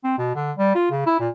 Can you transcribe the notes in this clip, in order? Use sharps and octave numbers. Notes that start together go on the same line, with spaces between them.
C4
B2
D3
G3
F4
C#3
E4
A#2